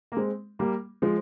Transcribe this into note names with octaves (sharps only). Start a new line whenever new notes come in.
A#3
G#3 C4
G3 A#3
F3 G#3